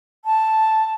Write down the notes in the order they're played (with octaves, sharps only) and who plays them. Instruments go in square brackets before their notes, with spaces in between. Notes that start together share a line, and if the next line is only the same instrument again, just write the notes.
[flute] A5